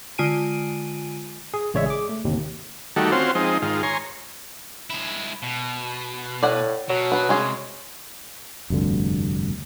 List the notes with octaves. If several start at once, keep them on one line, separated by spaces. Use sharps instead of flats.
D3 G#3 F4 G#5 D7 D#7
G#4
A1 C#3 G#3 C#5 D5 E5
G#4 D6
A3
G1 D#2 C3
D#3 G3 A3 F#4
C4 C#4 F4 F#4 C5
F3 G#3 C4 D#4
G#2 D#3 F4
C#5 G#5 A#5 C6
G#3 E4
B2
A2 D5 F#5
B2 F#3
B3 B4
C2 G#3 C#4 G#4
F1 D2 G2 D3